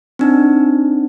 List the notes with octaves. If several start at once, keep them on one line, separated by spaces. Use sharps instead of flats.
C4 D4 D#4